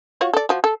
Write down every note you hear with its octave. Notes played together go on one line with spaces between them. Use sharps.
F4 F#4 C#5
A4 D5
F3 F#4
A4